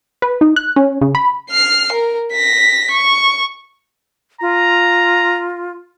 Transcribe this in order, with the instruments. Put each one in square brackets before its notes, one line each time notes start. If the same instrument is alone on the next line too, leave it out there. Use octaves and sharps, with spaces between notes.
[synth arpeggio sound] B4
D#4
F#6
C#4
C#3
B5
[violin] F6 C7
A#4
A#6 B6
C#6
[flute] F4 [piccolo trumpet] A#5